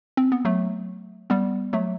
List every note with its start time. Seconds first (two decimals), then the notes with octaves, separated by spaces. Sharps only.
0.17 C4
0.32 B3
0.45 F#3 A3
1.30 G3 B3
1.73 F#3 A3